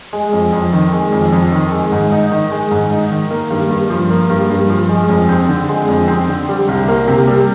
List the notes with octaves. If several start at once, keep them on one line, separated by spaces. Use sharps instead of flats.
G#3
F2
F2
D#3
G#3
F2
F2
D#3
G#3
G#2
D#4
D#3
G#3
G#2
D#4
D#3
A#3
G2
G2
F3
A#3
G2
G2
F3
G#3
F2
C4
D3
G#3
F2
C4
D3
G3
C2
A#3
C3
G3